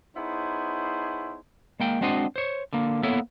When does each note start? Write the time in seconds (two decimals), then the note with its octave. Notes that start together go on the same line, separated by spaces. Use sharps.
0.15 B3 D#4 E4 G#4 C5 C#5
1.80 G#3 A#3 G5
2.01 G#3 C4 D4 F#4 C5 D#5
2.36 C5 C#5
2.73 D3 A#3
3.03 A#3 B3 E4 A4 C#5 E5